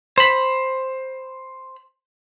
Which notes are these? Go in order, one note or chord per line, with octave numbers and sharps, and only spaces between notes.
C5 B5